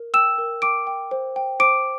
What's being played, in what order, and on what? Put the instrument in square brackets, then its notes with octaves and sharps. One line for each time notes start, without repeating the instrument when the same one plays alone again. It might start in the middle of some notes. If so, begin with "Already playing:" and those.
Already playing: [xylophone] A#4
G5 E6 E7
A#4
G5 D6 D7
G5
C5
G5
C5 D6 D7